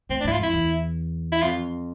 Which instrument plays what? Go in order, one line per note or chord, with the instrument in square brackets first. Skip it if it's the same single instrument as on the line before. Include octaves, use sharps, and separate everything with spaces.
[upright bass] A2 [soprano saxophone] C4
[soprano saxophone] D4
[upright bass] G#2 [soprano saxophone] E4
[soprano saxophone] F4
[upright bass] F2 [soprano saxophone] E4
[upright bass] E2
[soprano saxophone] E4
[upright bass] F2 [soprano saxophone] F4